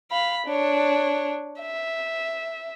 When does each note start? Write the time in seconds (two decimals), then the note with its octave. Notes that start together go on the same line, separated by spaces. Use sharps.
0.10 F5 B5
0.46 D4 C#5
1.60 E5